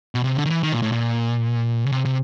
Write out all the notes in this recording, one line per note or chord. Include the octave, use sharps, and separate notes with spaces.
B2
C3
D3
D#3
E3
D#3
A#2
A2
A#2
C#3
C3
C3